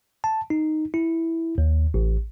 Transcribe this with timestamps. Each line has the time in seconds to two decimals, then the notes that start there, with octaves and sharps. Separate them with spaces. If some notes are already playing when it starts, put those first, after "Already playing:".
0.24 A5
0.50 D#4
0.94 E4
1.58 D#2
1.94 A1